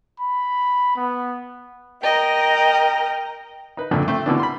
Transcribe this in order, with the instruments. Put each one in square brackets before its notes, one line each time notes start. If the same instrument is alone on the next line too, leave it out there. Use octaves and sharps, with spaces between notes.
[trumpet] B5
B3
[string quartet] A#4 D#5 G5
[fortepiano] D#4 B4
F2 A#2 D3 A3 D4
A3 C4
B2 D3 E3 D4
B5 C6